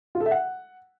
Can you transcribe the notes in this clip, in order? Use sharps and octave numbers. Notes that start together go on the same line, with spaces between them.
F4
A4
E5
F#5